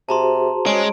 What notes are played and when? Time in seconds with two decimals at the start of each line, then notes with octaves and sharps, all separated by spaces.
0.09 C3 F#4 G#4 C5 A5 A#5 C6
0.66 G#3 C#4 D7